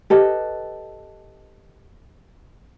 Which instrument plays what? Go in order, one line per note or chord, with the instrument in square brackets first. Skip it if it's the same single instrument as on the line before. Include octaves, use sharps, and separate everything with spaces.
[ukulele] G4 A4 B4 D#5